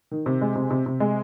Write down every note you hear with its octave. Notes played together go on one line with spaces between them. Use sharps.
D#3
C3
G#3
C3
C3
C3
G#3